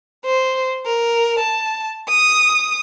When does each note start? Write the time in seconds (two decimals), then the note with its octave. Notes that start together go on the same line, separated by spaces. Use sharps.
0.25 C5
0.86 A#4
1.39 A5
2.09 D#6